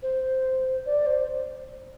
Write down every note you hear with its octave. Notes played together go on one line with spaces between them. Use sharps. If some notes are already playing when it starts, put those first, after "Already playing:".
C5
D5
C5